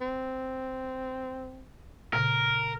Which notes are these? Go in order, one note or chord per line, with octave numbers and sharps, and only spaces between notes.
C4
A#2 C#3 A#4